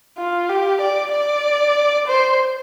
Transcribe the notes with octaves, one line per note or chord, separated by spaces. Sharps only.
F4
G4
D5
D5
C5